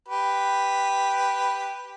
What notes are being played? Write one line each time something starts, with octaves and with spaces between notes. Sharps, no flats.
G4 B4